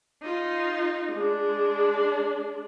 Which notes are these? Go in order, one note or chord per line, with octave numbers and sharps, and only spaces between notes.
D#4 F4
G#3 D4